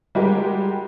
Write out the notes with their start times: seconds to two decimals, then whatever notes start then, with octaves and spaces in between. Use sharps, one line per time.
0.15 G3 G#3 F#4 G4 A#4